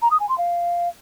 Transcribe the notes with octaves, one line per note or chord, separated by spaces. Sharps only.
A#5
D#6
G#5
C6
F5